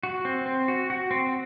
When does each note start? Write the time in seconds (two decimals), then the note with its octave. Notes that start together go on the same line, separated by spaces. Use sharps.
0.03 F#4
0.25 C4
0.46 C4
0.68 F#4
0.90 F#4
1.11 C4